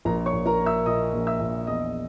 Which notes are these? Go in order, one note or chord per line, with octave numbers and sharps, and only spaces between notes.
A#1 A#4 A#5
C#5 C#6
A#1
A#4 A#5
A#3
E5 E6
A#2 D#5 D#6
A#1
E5 E6
A#1
E2 D#5 D#6